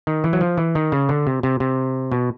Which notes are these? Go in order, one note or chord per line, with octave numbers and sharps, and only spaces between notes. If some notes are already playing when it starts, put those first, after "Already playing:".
D#3
E3
F#3
F3
E3
D#3
C#3
D3
C3
C3
C3
B2